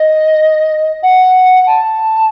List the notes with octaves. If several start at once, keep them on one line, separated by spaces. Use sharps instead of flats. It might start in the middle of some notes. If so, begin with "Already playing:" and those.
Already playing: D#5
F#5
A5